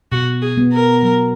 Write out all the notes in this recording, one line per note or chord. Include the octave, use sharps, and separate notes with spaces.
B2 F#4
G#4
B3
A#4
F#3